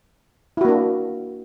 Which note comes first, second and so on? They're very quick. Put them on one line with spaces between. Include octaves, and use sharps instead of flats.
E4 F#4 A#3 D4